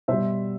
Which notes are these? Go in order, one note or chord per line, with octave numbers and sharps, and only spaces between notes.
B2 G3 C5 E5